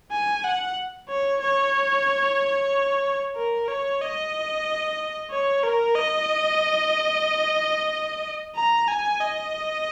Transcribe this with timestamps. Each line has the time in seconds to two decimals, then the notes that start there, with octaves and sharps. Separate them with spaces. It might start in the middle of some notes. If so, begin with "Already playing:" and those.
0.12 G#5
0.44 F#5
1.09 C#5
1.41 C#5
3.36 A#4
3.68 C#5
4.01 D#5
5.31 C#5
5.63 A#4
5.95 D#5
8.55 A#5
8.87 G#5
9.20 D#5